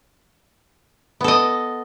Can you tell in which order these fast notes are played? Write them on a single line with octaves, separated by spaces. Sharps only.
B3 A4 D#5